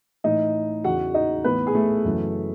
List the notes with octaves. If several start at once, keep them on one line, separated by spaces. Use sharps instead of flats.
A2 E3 D#4 D#5
E2 C#3 E3 F#4 F#5
D#4 D#5
A2 E3 B3 B4
G#4
A3 A4
F#2 C#3 E3